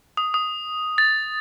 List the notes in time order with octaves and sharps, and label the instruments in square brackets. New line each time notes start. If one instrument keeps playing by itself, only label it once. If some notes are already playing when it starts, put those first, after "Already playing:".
[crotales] D#6
D#6
A6